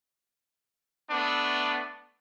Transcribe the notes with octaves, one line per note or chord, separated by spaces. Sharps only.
A3 B3 D4